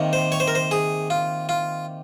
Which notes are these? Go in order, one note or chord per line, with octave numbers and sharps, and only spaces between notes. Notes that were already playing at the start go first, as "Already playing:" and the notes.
Already playing: C3 D#3 A#3
C5
C#5
C5
A#4
C5
G#4
F4
F4